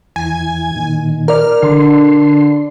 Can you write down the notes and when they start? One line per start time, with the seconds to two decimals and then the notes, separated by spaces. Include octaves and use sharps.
0.16 E2 E3 G#5
0.75 A#2 D#3
1.28 A#4 D5 F6
1.62 D3 D4 C6